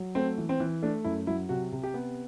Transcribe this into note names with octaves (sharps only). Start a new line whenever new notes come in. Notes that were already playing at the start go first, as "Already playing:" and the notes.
Already playing: F#3
A3 C4
E3
C4
E3
A3 D4
F#2 E4
F#3 E4
C3 F#4
C3
G4
B3